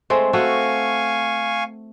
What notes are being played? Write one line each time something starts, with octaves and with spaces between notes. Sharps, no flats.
G#3 A3 C4
A3 F#4 A4 F5 G#5 C#6